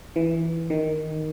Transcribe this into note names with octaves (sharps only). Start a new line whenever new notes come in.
E3
D#3